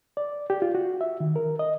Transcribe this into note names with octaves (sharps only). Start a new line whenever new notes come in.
D5
G4
F4
F#4
E5
D#3
A#4
D#5